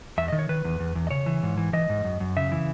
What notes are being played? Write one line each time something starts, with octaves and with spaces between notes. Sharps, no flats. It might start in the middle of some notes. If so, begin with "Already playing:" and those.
E2 E5
D#5
D#3
C#5
D#3 B4
E2
E2
E2
D#5
C#3 C#5
E3
G#2
E3
E3 D#5
G#2
F#2
F#2
C#3 E5
E3